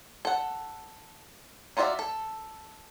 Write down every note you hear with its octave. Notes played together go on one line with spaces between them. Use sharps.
A4 F#5
D#4 F4 F#4 D5 E5
A4